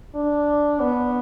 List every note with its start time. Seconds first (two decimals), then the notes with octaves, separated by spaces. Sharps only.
0.15 D4
0.81 B3